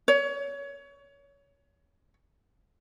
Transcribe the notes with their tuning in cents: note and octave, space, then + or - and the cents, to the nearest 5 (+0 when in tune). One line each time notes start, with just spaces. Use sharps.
C#5 +25